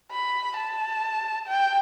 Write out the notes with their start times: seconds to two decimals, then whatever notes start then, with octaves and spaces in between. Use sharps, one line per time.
0.11 B5
0.57 A5
1.48 G5